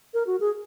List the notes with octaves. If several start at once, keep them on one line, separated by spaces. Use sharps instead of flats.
A#4
F#4
G#4